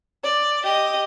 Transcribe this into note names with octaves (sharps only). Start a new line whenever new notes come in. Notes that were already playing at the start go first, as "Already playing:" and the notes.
D5
G4 D#5